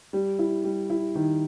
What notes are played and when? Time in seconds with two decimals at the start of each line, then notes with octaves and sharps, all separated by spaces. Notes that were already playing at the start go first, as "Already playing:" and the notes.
0.13 G3
0.39 E4
0.64 G3
0.90 E4
1.15 D#3